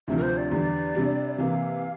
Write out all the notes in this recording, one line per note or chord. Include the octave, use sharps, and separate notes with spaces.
D2 C3 F3 E5
A#4
C5
D5
E2 D3 G3 D4
C3 G3 D4
C3 E3 A#3 F5